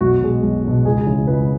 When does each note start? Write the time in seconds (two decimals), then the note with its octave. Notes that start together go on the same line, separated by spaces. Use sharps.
0.01 B1 F#4
0.22 B2 G#3
0.43 B1
0.64 B2 G#3
0.85 C#2 G#4
1.06 C#3 E3 G#3
1.27 C#2 B4